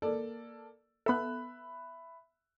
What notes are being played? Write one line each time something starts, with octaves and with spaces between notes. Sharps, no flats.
A#3 A4 D5
B3 A4 E5 B5 F#6